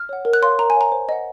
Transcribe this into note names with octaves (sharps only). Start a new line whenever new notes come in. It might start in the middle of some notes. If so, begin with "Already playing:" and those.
Already playing: F6
C#5 F#5
A#4
F#6
C#5 F5 C6
A#4 A#5
G#5
C#5 F5 A#5
C5
D#5 F#5